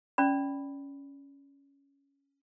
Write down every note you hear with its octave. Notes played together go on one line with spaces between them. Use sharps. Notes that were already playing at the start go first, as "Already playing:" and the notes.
C#4 D5 B5